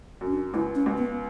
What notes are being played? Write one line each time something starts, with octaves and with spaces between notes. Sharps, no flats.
F#2
C#4
D4
C#2 E4
C#4
C#2
B3